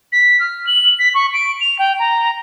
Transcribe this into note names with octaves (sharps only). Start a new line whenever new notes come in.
B6
F6
F#7
B6
C#6
D7
F7
G5
A#5